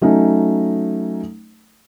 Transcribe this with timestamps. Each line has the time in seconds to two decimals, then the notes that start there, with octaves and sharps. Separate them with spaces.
0.02 F#3 A3 C#4 D#4